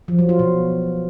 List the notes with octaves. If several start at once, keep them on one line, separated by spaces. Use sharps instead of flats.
F3
F#3
F4
B2